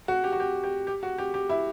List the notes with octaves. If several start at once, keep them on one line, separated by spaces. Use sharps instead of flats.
F#4
G4
F#4
G4
G4
G4
F#4
G4
G4
E4